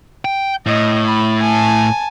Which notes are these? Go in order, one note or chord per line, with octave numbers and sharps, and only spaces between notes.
G5
A2 D#5
B5
G#5 A5